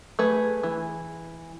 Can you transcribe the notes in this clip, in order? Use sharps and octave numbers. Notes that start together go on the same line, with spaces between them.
A3 G#4 B4
E3